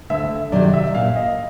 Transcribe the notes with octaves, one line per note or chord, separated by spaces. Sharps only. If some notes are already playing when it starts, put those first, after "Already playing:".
D2 E5
C3 D#3 F#3 D5
E5
A#2 F5
D#5